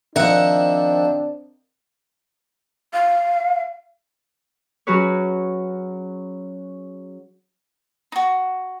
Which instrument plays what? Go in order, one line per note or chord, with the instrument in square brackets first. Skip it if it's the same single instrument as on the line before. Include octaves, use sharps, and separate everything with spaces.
[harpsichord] D#3 F3 [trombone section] C4 D4 [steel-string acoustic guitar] E5 F#5
[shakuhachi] F5
[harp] F#3 C#4 F#4 G#4 B4 C#5
[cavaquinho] D#4 F#4